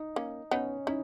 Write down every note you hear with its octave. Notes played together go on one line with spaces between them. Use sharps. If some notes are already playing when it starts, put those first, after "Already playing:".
Already playing: D#4
A#3 C#4
B3 C#4 D#4
C#4 D#4 E4